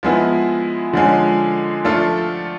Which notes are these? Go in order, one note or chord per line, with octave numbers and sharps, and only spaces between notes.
F3 G#3 B3 E4
D3 F3 G#3 C#4
F3 A3 D4 F4 A4